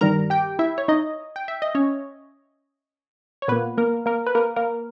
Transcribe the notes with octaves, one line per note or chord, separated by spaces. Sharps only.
G2 D#3 G3 A#4 A#5
G4 G5
E4 E5
C#5
D#4 D#5
G5
E5
D#5
C#4 C#5
C#5
A#2 A#3 B3 B4
A#3 A#4
A#3 A#4
B4
A#3 A#4
A#3 A#4